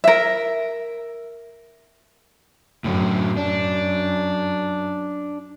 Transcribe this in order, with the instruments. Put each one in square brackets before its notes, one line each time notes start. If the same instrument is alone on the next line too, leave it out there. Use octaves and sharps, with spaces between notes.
[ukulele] A#4 E5
[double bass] F#2 [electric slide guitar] A2 D3 F#3
[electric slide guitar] D4